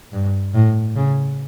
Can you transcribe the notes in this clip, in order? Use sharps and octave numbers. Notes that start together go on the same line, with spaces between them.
G2
A2
C#3